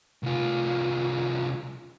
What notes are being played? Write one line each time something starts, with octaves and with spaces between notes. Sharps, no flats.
C2 F4